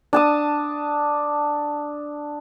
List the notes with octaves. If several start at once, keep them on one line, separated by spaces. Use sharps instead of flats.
D4 A5 D#6